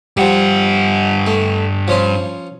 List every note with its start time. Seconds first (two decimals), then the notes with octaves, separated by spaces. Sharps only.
0.17 G2 F3 G3 F#5
1.27 A3
1.88 F3 C#4 C5